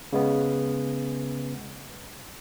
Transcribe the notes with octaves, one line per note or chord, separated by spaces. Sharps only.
C#3 G#3 B3